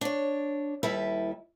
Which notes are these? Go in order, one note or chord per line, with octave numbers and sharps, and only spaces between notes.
D4 C#5
D#2 G3 E4 A4 B4 E5